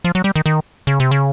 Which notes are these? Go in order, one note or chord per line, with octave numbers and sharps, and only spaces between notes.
F3
F#3
G3
D#3
D#3
C#3
C3
C#3